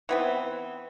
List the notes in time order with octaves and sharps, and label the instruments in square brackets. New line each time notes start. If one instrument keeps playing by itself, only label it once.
[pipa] E3 B3 C4